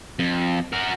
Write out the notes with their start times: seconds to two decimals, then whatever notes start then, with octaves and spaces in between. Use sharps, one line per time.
0.19 F2
0.73 F#4 A#4